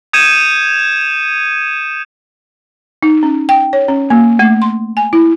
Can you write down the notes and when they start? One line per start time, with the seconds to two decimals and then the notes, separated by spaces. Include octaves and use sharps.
0.13 D#6 G6 G#6 C#7 D#7 E7
3.03 D#4
3.23 C#4
3.49 G5
3.73 C#5
3.88 C#4
4.10 A#3
4.39 A3
4.62 C6
4.97 G#5
5.13 E4